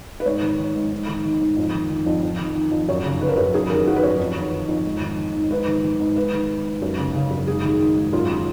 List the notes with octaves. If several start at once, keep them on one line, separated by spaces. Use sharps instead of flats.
B4
G#2 C#5
D#3
D#3
G#2
G#2
D#3
D#3
G#2
F2
D#3
D#3
F2
F2
D#3
D#3
F2
F#2 C#5
C#3
C#3 B4
A#4
F#2 B4
F#2 G#4
D#3 A#4
D#3 F#4
B4
F#2 C#5
F2
D#3
D#3
F2
G#2
D#3
D#3
G#2
G#2 B4
D#3
D#3
G#2
G#2 B4
D#3
D#3
G#2
F#2
C#3
C#3
F#2
G#2 G#4
D#3
D#3
G#2
F#2 F4
D#3